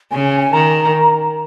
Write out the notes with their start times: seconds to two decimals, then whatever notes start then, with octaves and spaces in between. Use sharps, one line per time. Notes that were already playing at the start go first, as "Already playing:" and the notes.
0.11 C#3 G#5
0.41 G#5
0.53 D#3 A#5